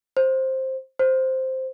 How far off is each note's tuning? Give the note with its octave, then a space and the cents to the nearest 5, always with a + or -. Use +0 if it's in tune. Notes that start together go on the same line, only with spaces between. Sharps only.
C5 +10
C5 +0